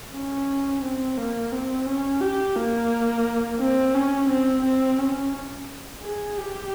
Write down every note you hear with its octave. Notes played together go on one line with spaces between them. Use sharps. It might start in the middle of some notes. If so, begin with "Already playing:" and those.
C#4
C4
A#3
C4
C#4
G4
A#3
C4
C#4
C4
C4
C#4
G#4
G4